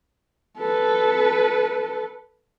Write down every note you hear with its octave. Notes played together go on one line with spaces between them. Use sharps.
A4 B4